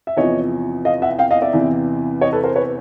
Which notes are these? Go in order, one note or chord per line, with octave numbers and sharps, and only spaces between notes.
E5
E2 C3 F3 C#5 D#5
D#5 F5
E5 F#5
F5 G5
D#5 F5
D5 E5
E2 C3 E3
C#5 D#5
A4 B4
A#4 C5
B4 C#5